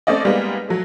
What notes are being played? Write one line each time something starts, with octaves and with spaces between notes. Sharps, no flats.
A3 C4 C#4 D5 D#5
G3 G#3 A#3 B3 D#4
F#3 A3